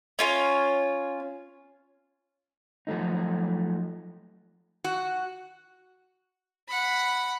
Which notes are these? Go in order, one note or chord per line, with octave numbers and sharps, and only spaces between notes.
C#4 F4 C#5
F3 F#3 A3 D#4
F#4
F#5 B5